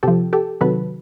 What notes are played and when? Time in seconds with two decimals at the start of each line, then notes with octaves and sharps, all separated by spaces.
0.03 C3 F3 G4 A4
0.33 G4 A4
0.61 C3 D#3 F#3 A4 B4